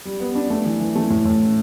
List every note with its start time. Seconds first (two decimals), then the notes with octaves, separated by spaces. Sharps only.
0.05 G3
0.20 B3
0.35 D4
0.50 A3
0.65 E3
0.80 E3
0.96 A3
1.10 A2
1.25 A2